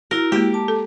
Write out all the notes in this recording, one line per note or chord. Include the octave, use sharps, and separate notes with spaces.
E4 F#4 A#4
G#3 A#3 G4
A5 D6
A4